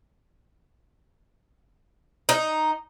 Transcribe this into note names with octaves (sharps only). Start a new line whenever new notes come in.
D#4